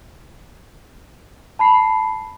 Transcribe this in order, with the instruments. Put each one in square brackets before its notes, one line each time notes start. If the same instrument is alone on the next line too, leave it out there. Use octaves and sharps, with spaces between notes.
[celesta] A5 B5 C7